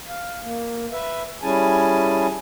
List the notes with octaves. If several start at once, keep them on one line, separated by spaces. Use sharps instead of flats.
F5
A#3
B4 E5
G3 C#4 E4 G#4 G#5 A5